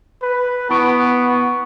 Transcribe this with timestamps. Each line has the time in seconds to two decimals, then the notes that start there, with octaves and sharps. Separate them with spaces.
0.23 B4
0.70 B3 E4 C#6 D7